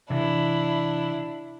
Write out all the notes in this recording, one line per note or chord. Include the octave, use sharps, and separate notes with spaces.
C3 E3 D4 E4